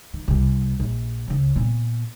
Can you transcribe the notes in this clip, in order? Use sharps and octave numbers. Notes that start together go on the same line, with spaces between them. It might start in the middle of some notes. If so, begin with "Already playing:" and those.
D#3
C2 C3
A#1
C#2 C#3
A#2 B3